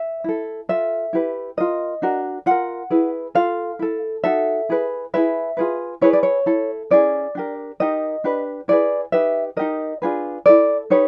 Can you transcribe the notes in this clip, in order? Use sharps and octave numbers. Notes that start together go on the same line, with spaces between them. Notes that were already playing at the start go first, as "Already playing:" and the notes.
Already playing: E5
E4 A4
F4 A4 E5
E4 G4 B4
F4 A#4 D#5
D4 F#4 A#4
F4 A#4 F#5
E4 G#4 B4
F4 A4 F5
E4 A4
D#4 F#4 A4 E5
E4 G#4 B4
E4 G#4 B4 E5
F4 G#4 B4
E4 G#4 B4 C#5
D5
C#5
E4 A4
C#4 E4 G#4 D5
D4 G4 A#4
D#4 G4 A#4 D#5
D4 G4 B4
E4 G#4 B4 D5
D#4 G4 B4 E5
D#4 G4 A#4 D#5
D4 F4 G#4 B4
E4 A4 D5
D#4 G4 B4 C#5